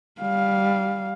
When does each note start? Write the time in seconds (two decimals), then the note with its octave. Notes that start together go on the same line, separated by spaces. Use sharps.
0.21 G3 F5